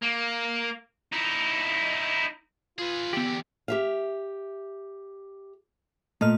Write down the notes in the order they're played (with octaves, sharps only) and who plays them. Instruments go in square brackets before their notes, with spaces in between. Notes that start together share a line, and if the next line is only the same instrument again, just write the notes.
[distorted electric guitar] A#3
D#4 E4
[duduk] F4 [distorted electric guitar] G#4 B4
[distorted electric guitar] E2 D3 [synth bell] B3 F#7 [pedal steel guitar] G4
[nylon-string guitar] G4 E5 F5
[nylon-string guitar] A#2 [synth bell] A3 D#5 F6